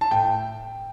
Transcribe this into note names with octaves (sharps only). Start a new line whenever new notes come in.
A5
A2 G5